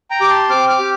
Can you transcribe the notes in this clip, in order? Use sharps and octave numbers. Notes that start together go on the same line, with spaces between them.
G5 A#5
G4 D6
A5 C6
C4 D6 F6
D6 F6
G4